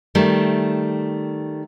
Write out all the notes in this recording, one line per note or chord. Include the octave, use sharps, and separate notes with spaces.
D#3 G3 A3